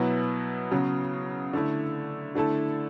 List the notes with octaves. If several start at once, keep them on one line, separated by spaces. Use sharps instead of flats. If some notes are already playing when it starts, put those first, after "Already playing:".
Already playing: B2 F#3 B3 E4 B4
C#3 F#3 B3
D3 A3 E4
D3 A3 E4 A4